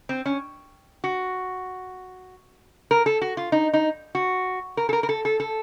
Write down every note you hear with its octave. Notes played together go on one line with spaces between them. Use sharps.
C4
C#4
F#4
A#4
A4
F#4
F4
D#4
D#4
F#4
A#4
A4
A#4
A#4
A4
A4
A4